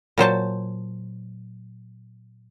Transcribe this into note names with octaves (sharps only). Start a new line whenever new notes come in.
A#2 F#3 C5 A5